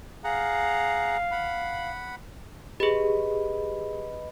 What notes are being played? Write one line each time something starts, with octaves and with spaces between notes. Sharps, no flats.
G#4 F5 F#5 A#5
F#5 B5
G4 G#4 B4 D#5 B5